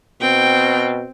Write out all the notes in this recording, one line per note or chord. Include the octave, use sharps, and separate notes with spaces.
B2 C4 G5